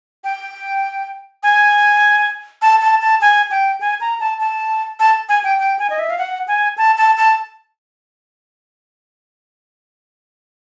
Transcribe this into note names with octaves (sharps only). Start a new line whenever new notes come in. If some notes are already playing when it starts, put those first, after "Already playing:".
G5
G#5
A5
A5
A5
G#5
G5
G#5
A#5
A5
A5
A5
G#5
G5
G5
G#5
D#5
E5
F5
F#5
G#5
A5
A5
A5